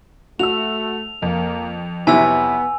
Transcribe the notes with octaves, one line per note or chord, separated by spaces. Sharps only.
A3 F#4 E6 F7
F2 A#3
C3 F#3 B3 E4 G#5 E6